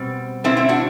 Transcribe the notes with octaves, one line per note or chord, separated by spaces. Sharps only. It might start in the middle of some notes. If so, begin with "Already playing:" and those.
Already playing: B2 G3 C4
B2 G3 C4 E4
C4 E4
D4 F#4